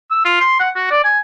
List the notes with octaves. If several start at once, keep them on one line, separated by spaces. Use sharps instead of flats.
E6
F4
C6
F#5
F#4
D5
G#5